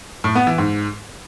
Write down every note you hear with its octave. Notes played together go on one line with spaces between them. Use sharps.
A2
B3
E3
G#2